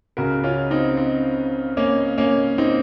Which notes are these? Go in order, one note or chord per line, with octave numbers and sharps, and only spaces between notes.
C#2 C#3 F#4 A#4
C#4 F4
C4 D#4
C4
A#3 C#4
A#3 C#4
C4 D#4